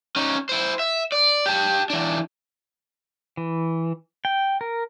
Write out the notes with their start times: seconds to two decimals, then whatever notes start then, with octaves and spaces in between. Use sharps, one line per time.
0.16 C#4 D#4
0.49 E4 C5
0.79 E5
1.12 D5
1.46 G4 A5
1.90 E3 D4
3.37 E3
4.25 G5
4.61 A#4